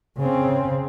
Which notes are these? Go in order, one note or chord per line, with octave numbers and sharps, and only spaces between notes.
C#3 C4